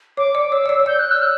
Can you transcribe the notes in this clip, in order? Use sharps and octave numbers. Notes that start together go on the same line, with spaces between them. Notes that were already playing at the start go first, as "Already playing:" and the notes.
C#5 D6
D5
C#5 E6
D5
C#5
C#5
D5 G6
F#6
E6
F#6